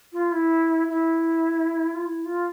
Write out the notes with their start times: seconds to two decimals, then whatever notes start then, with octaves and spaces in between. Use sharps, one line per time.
0.13 F4
0.32 E4
0.90 E4
1.95 F4
2.06 E4
2.25 F4